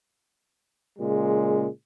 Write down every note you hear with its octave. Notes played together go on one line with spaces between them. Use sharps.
A#2 C#3 G#3